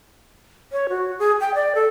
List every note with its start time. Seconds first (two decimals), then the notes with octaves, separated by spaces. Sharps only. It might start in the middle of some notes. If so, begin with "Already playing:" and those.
0.72 C#5
0.89 F#4
1.19 G#4
1.41 G5
1.55 D5
1.75 A4